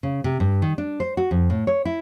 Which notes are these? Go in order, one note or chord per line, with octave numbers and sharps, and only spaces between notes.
C#3
C3
G2
D#3
D4
C5
F#4
F2
A2
C#5
E4